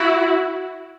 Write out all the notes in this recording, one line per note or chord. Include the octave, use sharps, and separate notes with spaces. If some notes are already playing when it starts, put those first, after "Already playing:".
Already playing: E4 F#4